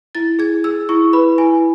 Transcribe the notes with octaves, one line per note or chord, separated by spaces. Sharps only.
E4 A6
G#4 G#6
G#4 E6
E4 C#6
B4 B5
E4 G#5